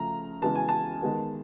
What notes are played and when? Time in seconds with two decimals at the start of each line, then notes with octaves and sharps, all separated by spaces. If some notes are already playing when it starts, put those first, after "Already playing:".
Already playing: C#3 F3 A3 A#5
0.42 C#3 E3 G#3 B3 A5
0.55 G#5
0.69 A5
1.02 D#3 G#3 B3